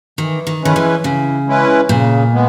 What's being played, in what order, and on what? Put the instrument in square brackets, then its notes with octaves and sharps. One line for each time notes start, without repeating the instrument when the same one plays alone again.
[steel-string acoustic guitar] D#3 [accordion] E3
[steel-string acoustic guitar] D#3
[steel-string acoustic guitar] D#3 [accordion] G#3 C#4 E4 B4
[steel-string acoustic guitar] E3
[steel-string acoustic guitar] C#3 [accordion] E3
[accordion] G#3 C#4 E4 B4
[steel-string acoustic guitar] A#2 [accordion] C#3
[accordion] G#3 B3